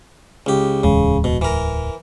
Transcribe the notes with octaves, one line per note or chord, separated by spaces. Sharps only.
C#2 G4
D1 E2 C#3 G#3
B2
E3 A#4